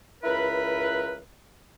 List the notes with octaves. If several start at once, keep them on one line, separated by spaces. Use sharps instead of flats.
C#2 E4 A#4 B4